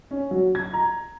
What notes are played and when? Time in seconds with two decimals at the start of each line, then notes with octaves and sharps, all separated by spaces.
0.11 C#4
0.31 F#3
0.55 G#6
0.73 A#5